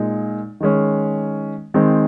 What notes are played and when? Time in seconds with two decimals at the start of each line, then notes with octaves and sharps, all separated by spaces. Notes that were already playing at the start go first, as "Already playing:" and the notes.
Already playing: A#2 G#3 D#4
0.60 D#3 G#3 C#4
1.74 D#3 G#3 C4 D#4